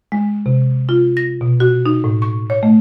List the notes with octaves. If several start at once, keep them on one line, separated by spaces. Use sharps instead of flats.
G#3
C3
F4
A#6
B2
F#4
D#4
A2
C#6
C#5
A3